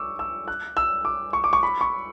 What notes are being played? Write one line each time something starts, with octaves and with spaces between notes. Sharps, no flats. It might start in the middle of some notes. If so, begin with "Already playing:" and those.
Already playing: C#6 D6 E6
E6
F#6
E6
D6
C#6
D6
C#6
B5
C#6